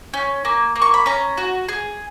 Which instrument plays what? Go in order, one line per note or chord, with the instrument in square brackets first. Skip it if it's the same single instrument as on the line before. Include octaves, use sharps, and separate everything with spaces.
[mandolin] C#4
A#3
A#3
C#6
B5
C#4 A#5
F#4
G#4